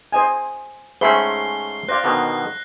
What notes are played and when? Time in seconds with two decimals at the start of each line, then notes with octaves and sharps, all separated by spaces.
0.12 C5 D#5 G#5
1.01 G#2 A3 C#4 C5 E5 B5 C7 G7
1.89 C5 D5 F5 F#6 A#6
2.04 B2 D3 D#3